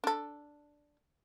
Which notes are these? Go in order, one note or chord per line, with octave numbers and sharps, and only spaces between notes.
D4 A4